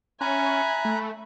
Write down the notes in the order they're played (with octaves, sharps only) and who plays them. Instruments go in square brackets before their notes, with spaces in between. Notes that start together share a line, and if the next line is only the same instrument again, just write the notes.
[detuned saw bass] C#4 [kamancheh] E5 G#5 [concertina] A#5 F#6 [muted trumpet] B5
[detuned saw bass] A3